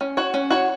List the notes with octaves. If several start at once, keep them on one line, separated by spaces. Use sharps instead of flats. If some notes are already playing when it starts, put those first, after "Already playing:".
C#4
F#4 C#5
C#4
F#4 C#5